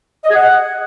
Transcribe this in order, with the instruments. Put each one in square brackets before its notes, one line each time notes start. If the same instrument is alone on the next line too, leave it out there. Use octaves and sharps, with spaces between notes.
[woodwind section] D#5
G#4
F#5